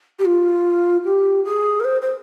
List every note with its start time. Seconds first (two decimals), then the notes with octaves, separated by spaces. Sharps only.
0.19 G4
0.25 F4
1.04 G4
1.45 G#4
1.80 A#4
1.84 C5
2.02 C5